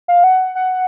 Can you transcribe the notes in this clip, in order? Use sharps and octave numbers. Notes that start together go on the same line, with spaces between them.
F5
F#5
F#5